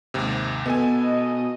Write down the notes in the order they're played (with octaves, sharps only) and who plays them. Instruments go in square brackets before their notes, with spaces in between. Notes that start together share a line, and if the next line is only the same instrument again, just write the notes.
[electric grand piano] D#2 G#2 C3
[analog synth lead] B2 [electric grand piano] B3 A4 G#5
[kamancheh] D#5